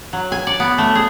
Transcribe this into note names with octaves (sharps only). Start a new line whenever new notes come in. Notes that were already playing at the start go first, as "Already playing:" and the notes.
F#3
G#5
D5
B3
A3
G#4